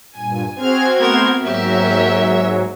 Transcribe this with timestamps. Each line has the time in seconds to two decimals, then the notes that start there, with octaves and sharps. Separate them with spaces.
0.17 G2 A#2 G#5
0.60 C4 F#4 G#4 F6 G#6
0.99 A3 B3 A#4 C5
1.43 G#2 F#3 A#3 G4 A#4 E5